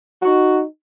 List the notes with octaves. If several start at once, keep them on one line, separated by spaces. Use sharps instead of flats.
D#4 F#4